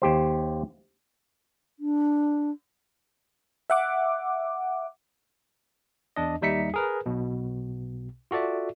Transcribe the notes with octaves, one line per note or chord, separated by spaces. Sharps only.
D#2 G4 C5
D4
E5 F#5 D6
E2 D4 D#5
D#2 G3 D#4 E5 B6 C#7
G#4 A#4 B4
B1 B2
F4 F#4 A4 D5 E5